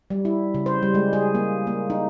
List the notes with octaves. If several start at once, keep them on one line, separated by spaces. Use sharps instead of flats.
G3
E4
C#3
C5
G3
G#3
G#4
A#3
A#3
D#4